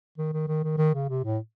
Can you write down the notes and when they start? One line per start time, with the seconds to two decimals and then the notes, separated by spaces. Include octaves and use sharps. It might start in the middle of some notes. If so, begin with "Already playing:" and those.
0.18 D#3
0.33 D#3
0.48 D#3
0.63 D#3
0.78 D#3
0.94 C#3
1.09 C3
1.24 A2